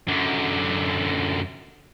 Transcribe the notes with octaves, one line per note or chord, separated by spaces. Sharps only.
F#2 D3